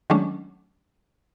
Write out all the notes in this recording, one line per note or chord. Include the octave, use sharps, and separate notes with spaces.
D#3 F#3 G#3 A3 C#4 D4